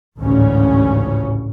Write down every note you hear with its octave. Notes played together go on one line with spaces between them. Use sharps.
A1 D2 G#2 C#3 C#4